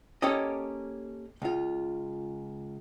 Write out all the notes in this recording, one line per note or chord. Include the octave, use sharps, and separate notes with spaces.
A#3 C#4 G4 A4 D#5
C#2 F4